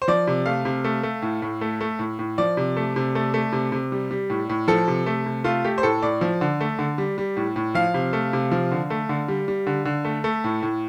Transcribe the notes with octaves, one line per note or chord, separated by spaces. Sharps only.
C5
F3 D5
C3
A3 F5
C3
A3
A3
A2
A2
A3
A3
A2
A2
F3 D5
C3
A3
C3
A3
A3
C3
C3
G3
G3
A2
A2
F3 A4
C3
A3
C3
A3 F4
A3 G4
C5
A2 A4
A2 D5
F3
D3
A3
D3
G3
G3
A2
A2
F3 F5
C3
A3
C3
F3
D3
A3
D3
G3
G3
D3
D3
A3
A3
A2
A2